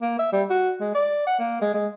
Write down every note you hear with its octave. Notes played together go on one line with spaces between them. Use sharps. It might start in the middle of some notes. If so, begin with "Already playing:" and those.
A#3
E5
G3
F#4
G#3
D5
F#5
A#3
G#3
G#3